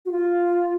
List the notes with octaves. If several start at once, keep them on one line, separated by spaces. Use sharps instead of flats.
F#4
F4